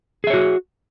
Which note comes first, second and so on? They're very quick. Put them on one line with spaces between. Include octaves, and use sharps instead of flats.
G#4 E5 C#5 F#4